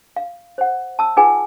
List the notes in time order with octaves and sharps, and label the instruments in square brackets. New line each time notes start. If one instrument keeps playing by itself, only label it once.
[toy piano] F5
C5 F#5
A5 E6
D#4 F4 G#4 B4 F#5 G#5